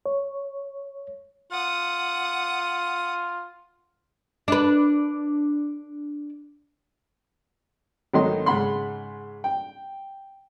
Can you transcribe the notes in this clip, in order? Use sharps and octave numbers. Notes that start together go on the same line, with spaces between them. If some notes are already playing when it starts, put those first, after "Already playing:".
C#5
F4 F#5 D#6
D4 B4
G#1 D#3 F#3 A3 D#4 C6
G#2 C#3 G#3 F#5 B5 C6
G5